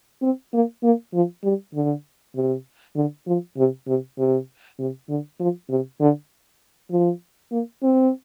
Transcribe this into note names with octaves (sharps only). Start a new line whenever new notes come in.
C4
A#3
A#3
F3
G3
D3
C3
D3
F3
C3
C3
C3
C3
D3
F3
C3
D3
F3
A#3
C4